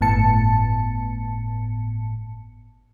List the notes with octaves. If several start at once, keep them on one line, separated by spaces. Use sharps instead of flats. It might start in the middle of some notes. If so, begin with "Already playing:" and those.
G1 A2 B3 A5 C#7